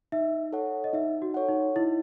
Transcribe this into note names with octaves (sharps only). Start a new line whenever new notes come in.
D#4 E5
A4 C#5 F#5
D#5
D#4 E5
F#4
A4 C#5 F#5
D#4
D#4 E4